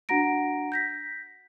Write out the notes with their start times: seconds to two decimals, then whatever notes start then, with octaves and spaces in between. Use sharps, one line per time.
0.09 D4 F#4 F#5 A#5 A#6 D7
0.72 G6 A#6 B6